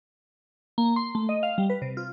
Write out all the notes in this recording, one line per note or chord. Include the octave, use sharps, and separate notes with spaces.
A#3
C6
A3
D#5
F5
G3
B4
C3
F4